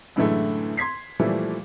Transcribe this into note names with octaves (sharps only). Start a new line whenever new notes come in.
F#2 A2 D3 E3 G#3 A3
C6 G#6 B6 C7
A#2 E3 F3 G3 A3